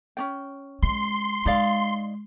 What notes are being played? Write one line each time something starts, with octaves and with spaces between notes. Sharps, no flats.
C#4 D4 G5
G#3 C6
G#3 D#4 D5 F5